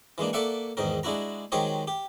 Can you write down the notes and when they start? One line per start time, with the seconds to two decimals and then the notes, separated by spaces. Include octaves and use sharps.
0.18 E3 G#3 A#3 D4
0.33 A#3 A4 D5 E5 F#5 C#6
0.77 E2 G#2 D#3 A#4
1.03 G#3 D4 E4 F#4 A#5
1.52 D#3 F#3 G#3 G4 C5 C#5
1.88 G4